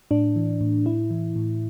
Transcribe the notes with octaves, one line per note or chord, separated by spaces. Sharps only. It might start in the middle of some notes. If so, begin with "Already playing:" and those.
A2 D4
E3
A2
A2 E4
E3
A2